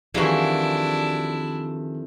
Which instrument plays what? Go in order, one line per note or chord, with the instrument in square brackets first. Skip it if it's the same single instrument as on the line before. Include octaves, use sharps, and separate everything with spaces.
[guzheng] F2 E3 [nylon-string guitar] D#3 G3 [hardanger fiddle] D4 E4 [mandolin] F#4 G#4